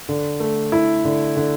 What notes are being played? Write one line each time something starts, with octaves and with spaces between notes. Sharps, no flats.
D3
A3
E4
D3
D3